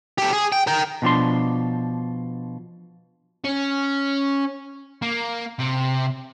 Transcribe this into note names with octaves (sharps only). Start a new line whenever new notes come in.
G4 A4
G#4
G5
A#4 G5
B2 F3 D4 C6
C#4
A#3
C3